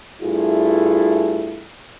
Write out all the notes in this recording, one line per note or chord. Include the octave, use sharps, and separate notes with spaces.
G2 A3 E4 F4 G#4